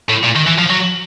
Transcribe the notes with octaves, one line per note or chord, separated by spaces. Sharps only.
A2
A#2
D#3
E3
F3
F#3